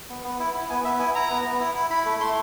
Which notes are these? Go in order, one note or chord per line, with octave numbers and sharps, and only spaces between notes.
B3
B3
E4
E4
B3 G#5
B3 E5
E4 G#5
E4 A#5
B3
B3
E4
E4
E4 B5
A3
A3 C6